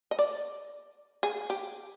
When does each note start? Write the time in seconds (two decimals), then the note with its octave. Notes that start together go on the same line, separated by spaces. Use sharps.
0.11 D#5
0.19 D5
1.23 G#4
1.50 G4